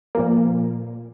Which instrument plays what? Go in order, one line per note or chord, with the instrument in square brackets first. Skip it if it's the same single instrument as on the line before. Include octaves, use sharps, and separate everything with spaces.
[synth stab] A#2 F3 A#3